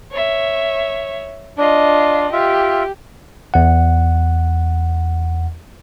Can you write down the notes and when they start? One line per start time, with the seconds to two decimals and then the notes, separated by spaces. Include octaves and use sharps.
0.11 C#5 E5
1.58 D4 F4 D#5
2.33 F4 G4 E5
3.54 E2 F#5